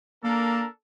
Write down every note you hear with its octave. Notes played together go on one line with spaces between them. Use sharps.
A#3 D4 A4 A#4